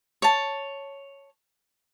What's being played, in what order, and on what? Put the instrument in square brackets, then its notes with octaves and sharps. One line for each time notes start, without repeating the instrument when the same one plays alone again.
[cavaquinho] C#5 A5